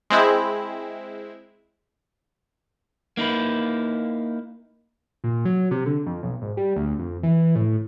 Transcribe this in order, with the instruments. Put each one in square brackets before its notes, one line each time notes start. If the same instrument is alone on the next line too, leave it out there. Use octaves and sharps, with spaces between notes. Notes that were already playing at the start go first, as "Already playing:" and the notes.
[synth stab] G#3 C4 E4
[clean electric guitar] A#3 D#4 E4 B4
[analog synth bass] A#2
F#3
C3
D3
F2
B1
G#1
G3
D2
F2
E3
A2